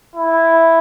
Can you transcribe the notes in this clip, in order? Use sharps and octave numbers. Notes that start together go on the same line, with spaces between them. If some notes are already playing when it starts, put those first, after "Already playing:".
E4